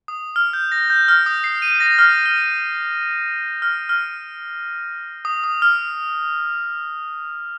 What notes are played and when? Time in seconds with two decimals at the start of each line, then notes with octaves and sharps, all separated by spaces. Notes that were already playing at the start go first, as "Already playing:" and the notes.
0.08 D#6
0.36 F6
0.53 G6
0.72 A#6
0.90 G6
1.08 F6
1.26 D#6
1.44 C7
1.62 D#7
1.80 A#6
1.98 F6
2.26 F6
3.62 F6
3.89 F6
5.25 D#6
5.44 D#6
5.62 F6